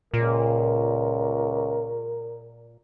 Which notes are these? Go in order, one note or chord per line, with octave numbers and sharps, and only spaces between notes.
C#2 A#2 A#4